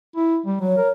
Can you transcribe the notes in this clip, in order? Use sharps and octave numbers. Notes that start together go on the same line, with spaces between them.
E4
G3
F#3 C#5
A#4